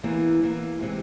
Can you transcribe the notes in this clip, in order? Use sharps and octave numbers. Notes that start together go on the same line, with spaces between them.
E2 E3 A#3
E2 E3 A#3
C3 E3 G#3